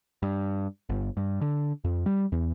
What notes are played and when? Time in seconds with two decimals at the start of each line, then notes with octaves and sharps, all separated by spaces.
0.23 G2
0.89 G1
1.17 G2
1.41 D3
1.84 F2
2.06 G3
2.32 E2